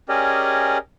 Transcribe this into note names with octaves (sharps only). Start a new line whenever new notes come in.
C#4 G4 G#4 A#4 D5 D#5